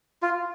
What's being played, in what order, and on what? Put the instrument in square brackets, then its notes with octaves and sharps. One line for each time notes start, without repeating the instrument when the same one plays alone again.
[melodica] F4